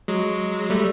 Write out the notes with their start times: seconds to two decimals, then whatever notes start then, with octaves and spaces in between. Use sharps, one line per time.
0.08 F#3 G#3
0.70 G3 A3